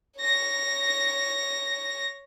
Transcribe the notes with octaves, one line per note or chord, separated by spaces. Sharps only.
C#5 A#6